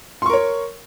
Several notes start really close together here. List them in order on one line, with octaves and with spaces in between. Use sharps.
C6 C#6 A#4 C#5